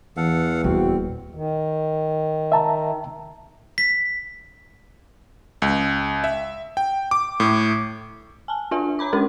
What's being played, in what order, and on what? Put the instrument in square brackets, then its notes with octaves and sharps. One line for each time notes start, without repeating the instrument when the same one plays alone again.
[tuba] E2 [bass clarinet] E3 [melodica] A4 F5 F#5
[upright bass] D#1 [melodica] C4 [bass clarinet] F#4
[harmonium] D#3
[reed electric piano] E5 A5 A#5
[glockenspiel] B6
[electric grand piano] C#2
E5
G5
D6
A2
[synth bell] G#5 A5
D4 F4 A4 E5 G#5
C#5 A#5 B5 D6
G#3 C#4 D4 G4 A#4